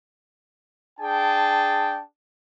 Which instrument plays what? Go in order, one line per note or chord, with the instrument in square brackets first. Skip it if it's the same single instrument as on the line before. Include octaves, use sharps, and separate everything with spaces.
[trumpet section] D4 G#4 G5 A5